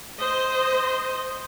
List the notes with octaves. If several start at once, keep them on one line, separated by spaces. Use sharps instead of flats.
C5 D#5